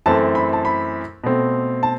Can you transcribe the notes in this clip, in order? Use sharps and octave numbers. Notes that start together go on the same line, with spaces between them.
F#2 E3 A3 C4 A5
B5
A5
B5
B2 A3 C4
A5